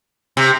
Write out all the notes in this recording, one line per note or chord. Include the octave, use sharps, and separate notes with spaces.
C3